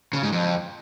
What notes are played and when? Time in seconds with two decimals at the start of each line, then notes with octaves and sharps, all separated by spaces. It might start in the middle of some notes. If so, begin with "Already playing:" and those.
0.13 C#3
0.23 G#2
0.32 F2